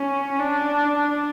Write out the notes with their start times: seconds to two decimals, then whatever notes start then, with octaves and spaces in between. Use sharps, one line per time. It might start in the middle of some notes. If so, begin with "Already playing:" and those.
Already playing: C#4
0.39 D4